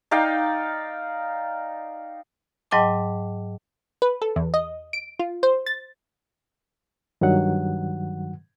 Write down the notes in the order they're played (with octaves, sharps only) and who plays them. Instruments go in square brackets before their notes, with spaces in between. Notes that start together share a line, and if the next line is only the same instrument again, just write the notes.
[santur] D#4 D5 F5 G5
[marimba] G#2 F#3 D#5 G5 A5 D6
[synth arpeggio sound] B4
A4
E2
D#5
D7
F4
C5
A6
[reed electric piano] G2 D#3 F#3 F#5